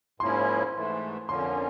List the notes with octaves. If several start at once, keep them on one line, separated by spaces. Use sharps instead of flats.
G#2 F3 A#3 C#4 E4 C6
G#2 E3 A3
F2 D3 F3 A#3 C#4 C6